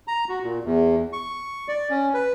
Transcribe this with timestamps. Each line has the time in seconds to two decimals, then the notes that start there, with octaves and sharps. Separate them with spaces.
0.08 A#5
0.29 F#4
0.43 A#2
0.64 E2
1.13 C#6
1.68 D5
1.90 C#4
2.14 B4